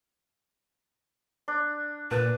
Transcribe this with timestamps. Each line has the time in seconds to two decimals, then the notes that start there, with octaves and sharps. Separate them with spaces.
1.48 D4
2.11 A#2 B4 A5